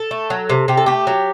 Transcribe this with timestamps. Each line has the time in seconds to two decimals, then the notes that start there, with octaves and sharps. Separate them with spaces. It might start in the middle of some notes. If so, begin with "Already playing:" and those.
Already playing: A4
0.11 A3
0.30 F#3
0.49 C3
0.68 C3 G4
0.78 A4
0.86 A3 G4
1.07 F#3